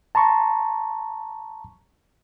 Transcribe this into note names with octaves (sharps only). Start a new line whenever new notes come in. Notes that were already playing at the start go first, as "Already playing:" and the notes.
A5 A#5 C6 C#6